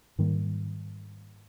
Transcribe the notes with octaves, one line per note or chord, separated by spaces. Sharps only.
G#2 D#3 G3 A#3